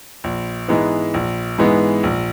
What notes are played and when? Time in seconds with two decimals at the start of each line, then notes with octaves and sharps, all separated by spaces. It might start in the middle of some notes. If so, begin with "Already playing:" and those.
0.24 A#1
0.68 G#2 E3 G#3 B3
1.14 A#1
1.58 G#2 E3 G#3 B3
2.03 A#1